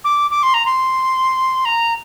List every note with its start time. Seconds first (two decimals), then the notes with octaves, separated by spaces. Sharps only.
0.04 D6
0.31 D6
0.43 C6
0.54 A#5
0.66 C6
1.65 A#5